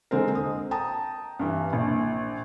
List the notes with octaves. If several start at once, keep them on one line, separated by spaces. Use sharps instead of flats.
D3 G#3 C4 A#4
D#6
G5 A5 A#5 D#6
G2 E3
A#1